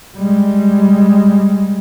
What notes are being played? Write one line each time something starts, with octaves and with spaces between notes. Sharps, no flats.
G3 G#3